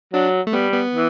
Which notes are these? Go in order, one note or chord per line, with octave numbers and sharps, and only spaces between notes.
F#3 D4
A3
G3 B3
B3
E3